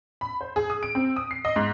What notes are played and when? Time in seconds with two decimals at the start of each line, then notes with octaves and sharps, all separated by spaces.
0.21 B5
0.41 C5
0.56 G#4
0.70 D#6
0.83 D7
0.95 C4
1.16 D#6
1.31 C7
1.45 D#5
1.56 G#2